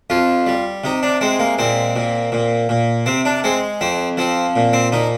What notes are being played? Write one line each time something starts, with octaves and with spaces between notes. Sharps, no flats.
F2 F4
G3
C3 D#4
D4
G#3 C4
A#3
A#2 C4
A#2
A#2
A#2
C3 C4
D4
G#3 C4
F2 C4
F3 C4
A#2
C4
A#2 D#4